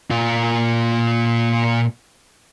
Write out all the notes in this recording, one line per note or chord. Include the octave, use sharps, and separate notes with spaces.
A#2 F4